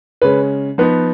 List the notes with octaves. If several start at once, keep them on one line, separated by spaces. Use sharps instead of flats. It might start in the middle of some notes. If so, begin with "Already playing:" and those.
C#3 G#3 C#4 B4
F3 B3 D#4 B4